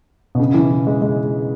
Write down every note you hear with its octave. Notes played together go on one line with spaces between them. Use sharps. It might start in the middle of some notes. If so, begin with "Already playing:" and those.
B2
C#3
E3
G#3
G#3